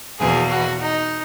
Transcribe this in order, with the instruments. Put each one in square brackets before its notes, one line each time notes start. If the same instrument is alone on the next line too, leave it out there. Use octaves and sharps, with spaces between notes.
[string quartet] E2 B2 A#3 [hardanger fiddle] G#4
[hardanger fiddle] F#4
D#4